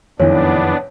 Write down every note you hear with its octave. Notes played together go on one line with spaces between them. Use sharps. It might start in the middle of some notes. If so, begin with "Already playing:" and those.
F#1 F2 A2 D#3 E3 B3 D4 C#5